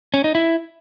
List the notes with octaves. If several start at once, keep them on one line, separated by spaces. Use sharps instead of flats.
C#4
D#4
E4